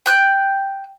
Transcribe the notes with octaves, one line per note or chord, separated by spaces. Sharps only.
G5 F#6 G6